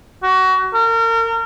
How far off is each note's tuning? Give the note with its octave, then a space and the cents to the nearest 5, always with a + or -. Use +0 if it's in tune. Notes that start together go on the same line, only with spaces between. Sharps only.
F#4 +25
A#4 -35